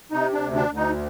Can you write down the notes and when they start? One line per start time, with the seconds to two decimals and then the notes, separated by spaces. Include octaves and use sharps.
0.12 C3 D#4
0.33 D4
0.41 D2
0.55 D4
0.70 D2
0.76 D#4